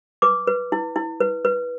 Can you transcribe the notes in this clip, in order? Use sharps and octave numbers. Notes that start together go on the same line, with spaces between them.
B4 D6
B4
E4
E4
B4
B4